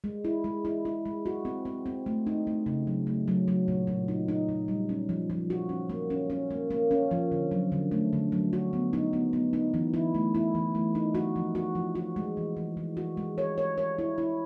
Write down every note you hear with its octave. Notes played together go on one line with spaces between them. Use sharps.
G#3
E4
G#3
E4
E4
G#3
F#4
C4
C4
C4
A3
D#4
A3
C#3
F#3
A3
F#3
F#3
A#2
A#2
D#4
D#4
A#2
G3
C#4
F3
F3
F#4
C#4
A#3
C#4
C#4
A#3
A#3
C#4
F3
D3
F#3
D3
A3
D3
F#3
F#4
B3
D#4
B3
B3
D#4
E3
E4
A3
E4
E3
A3
D#4
F#4
F3
F#4
F3
F#4
G#3
E3
E3
E3
F#4
G#3
C#5
C#5
C#5
E4
E4